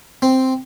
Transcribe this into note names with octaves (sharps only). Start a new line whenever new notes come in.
C4